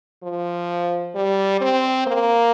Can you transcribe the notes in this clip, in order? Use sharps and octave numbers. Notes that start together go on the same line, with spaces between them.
F3
G3
C4
A#3